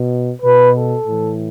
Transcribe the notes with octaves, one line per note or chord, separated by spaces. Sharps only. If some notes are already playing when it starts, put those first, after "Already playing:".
Already playing: B2
B2 B4
A4
A2 E3